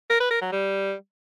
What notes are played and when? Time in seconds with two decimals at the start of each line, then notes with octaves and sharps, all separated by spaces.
0.10 A#4
0.20 B4
0.31 A#4
0.41 F#3
0.52 G3